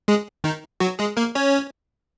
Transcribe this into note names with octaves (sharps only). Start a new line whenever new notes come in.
G#3 G#4
D#3 D#4
F#3 F#4
G#3 G#4
A#3 A#4
C#4 C#5